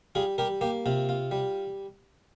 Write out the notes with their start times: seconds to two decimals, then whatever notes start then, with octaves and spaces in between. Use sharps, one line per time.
0.15 G3 F4 G#4
0.38 G3 G4 A#4
0.61 A#3 G4
0.86 C3 F4
1.09 F4
1.31 G3